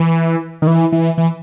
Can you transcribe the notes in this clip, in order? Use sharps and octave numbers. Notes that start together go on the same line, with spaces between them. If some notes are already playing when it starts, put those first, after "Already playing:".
Already playing: E3
D#3
E3
E3
E3